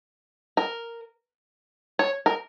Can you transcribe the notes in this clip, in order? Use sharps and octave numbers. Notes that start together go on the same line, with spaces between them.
A#4
C#5
A#4